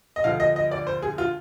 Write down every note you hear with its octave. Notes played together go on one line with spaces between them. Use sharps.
D#5
D2 D3 F3 F5
D#5
D#5
D5
C5
G#4
F4